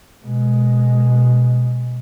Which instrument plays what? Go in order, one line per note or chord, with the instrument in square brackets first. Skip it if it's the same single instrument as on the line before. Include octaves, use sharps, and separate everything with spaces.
[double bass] B2 G#3